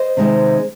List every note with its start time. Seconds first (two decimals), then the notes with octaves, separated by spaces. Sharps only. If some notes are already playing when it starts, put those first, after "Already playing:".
Already playing: C5 D#5
0.17 C3 D#3 G#3